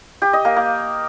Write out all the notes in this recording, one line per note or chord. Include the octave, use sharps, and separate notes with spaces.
G4
D#5
A#3
A#3